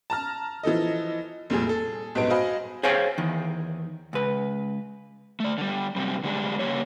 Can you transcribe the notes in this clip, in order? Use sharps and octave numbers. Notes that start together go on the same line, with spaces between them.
A5 A#5 F6
E3 F3 A4 D#5
F1 A#2 G3 G#4
G#4 A4
B1 G2 G#3 B3 D7
F#4 C5 D#5 F5 G#5 B5
G#4 C5 C#5 F5 G5 G#5
E2 D#3
C#2 B4
A3 D5
D3 G3
F#2 C3 G3
D3 G3 G#3 D4
C#3 F3 A#3 G4 C#5